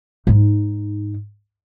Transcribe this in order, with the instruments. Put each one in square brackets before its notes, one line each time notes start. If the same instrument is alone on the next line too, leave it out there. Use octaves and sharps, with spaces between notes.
[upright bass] G#2 D#4